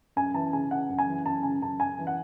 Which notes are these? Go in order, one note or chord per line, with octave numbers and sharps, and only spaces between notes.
F#2 G#5
E3 A5
C#3 G#5
C#3 F#5
F#2
G#5
E3
F#2 A5
C#3 G#5
F#2 A5
F#2 G#5
E3
F#5